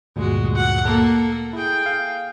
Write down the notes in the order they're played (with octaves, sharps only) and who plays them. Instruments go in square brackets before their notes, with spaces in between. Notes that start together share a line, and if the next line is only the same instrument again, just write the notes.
[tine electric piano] D2 G2 A#2 [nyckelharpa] G#3 F#4
[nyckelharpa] F#5
A#3 A4
[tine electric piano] E4 [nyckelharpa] G#4 G5
[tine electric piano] F5